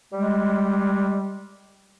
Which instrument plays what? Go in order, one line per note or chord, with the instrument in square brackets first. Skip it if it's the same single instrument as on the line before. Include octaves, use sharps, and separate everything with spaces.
[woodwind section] G3 G#3